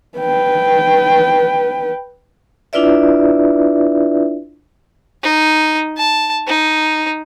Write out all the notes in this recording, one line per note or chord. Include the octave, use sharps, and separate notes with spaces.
B4 G5
D4 E4 F4 B4 D5 E5
D#4
A5
D#4